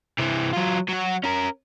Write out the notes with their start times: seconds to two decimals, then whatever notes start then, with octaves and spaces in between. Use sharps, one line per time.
0.19 C3 E3
0.53 F#3 F4
0.89 F#3 F#4
1.23 C#4 A#4